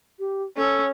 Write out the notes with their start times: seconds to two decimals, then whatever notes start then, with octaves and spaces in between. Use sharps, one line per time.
0.19 G4
0.57 C#4 A4